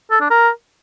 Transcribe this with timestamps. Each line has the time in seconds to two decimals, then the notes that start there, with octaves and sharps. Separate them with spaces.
0.11 A4
0.21 D4
0.30 A#4